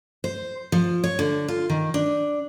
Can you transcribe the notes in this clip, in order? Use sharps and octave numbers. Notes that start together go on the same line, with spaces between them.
C5
F3
C#5
D3
F4
D#3
D4